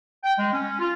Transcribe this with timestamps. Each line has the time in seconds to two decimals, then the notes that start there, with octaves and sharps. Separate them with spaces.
0.24 G5
0.39 G#3
0.53 C#4
0.80 F4